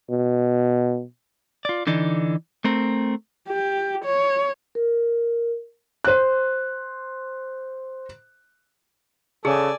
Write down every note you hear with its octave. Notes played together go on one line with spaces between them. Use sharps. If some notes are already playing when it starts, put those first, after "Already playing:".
B2
F4 D5
D3 E3 D#4 D5
A3 C4 A#4
G4
C#5
A#4
C5 F#6
C#3 G#4 A4 D5 G#5